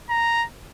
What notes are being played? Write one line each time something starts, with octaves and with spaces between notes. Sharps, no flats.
A#5